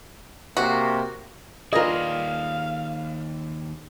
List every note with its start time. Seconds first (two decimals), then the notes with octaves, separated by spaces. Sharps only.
0.57 C3 A#3 F#4
1.73 D#2 F4 G#4 A#4 B4 D5 D#5 F5